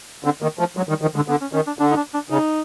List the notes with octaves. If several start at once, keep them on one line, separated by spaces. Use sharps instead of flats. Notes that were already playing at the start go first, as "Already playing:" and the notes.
D3 C4
D#3 A#3
F3 A3
F#3 G#3
D#3 G3
D#3 F3
D3 G#3
D3 B3
C#4
D#3 C#4
D4
D3 D4
D#4
D4
D4
C#3 D#4